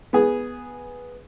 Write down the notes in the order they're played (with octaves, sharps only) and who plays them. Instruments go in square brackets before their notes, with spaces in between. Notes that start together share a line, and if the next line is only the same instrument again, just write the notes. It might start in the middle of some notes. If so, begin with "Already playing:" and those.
[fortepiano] B3 G#4